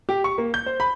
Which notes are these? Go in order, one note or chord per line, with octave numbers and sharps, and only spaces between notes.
G4
C#6
A#3
G6
C5
B5